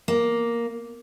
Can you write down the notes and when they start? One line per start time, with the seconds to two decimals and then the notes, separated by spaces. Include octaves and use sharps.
0.08 A#3